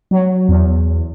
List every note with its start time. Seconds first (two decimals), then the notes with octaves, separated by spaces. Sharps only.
0.11 F#3
0.48 E2